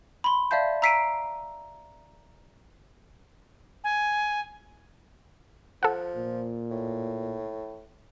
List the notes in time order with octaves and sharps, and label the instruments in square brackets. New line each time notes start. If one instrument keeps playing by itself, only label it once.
[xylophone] B5 C6
D5 E5 F5 A5 G6
A#5 E6 B6 C7 D7 D#7
[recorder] G#5
[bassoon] F3 [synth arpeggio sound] A4 F#5
[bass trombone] A#2
[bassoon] A2